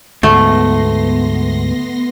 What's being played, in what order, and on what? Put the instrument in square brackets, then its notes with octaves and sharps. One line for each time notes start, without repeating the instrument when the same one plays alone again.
[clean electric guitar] D2 G#2 [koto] A3 [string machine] B3 C6 A#6